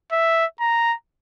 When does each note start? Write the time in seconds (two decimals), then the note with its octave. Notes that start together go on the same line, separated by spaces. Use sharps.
0.12 E5
0.60 A#5